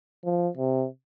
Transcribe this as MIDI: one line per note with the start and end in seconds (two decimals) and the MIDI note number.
0.25 0.48 53
0.57 0.85 48